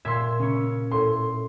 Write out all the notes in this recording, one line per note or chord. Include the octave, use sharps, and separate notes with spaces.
A#2 E5 C6 E6 G#6
C#3 C#4 C#5
A2 C6